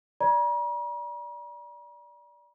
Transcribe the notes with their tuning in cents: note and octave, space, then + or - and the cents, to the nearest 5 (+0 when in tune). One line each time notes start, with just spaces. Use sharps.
D5 +0 A#5 +45